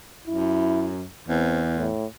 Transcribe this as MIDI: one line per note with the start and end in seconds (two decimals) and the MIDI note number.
0.27 1.05 42
0.27 0.91 64
1.28 1.89 40
1.28 1.60 60
1.76 2.05 45